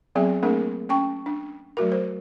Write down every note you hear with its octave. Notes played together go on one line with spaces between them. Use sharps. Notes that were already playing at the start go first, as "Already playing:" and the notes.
F#3 B3 C4 G#4 E5
A3 A#3 C4 D4 G#4 A#4
C#4 G5 C#6
D4
F#3 A3 F#4 A#4
C5